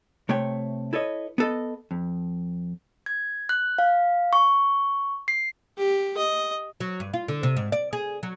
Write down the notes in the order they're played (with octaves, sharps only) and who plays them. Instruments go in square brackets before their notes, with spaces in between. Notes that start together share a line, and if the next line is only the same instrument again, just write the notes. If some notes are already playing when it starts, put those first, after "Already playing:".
[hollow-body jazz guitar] C3 A3 C#5 G5
E4 A4 B4 C#5 D#5
B3 A4 D#5
F2
[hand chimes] G#6
F#6
F5
C#6
C7
[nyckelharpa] G4
D#5
[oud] F#3
G2
F4
D3
C3
G#2
D5
G#4
F#3